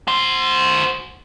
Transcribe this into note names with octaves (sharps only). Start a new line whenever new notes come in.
F#4 C5